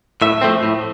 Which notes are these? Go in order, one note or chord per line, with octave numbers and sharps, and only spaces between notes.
A2 E5
F3 A3 C4
A2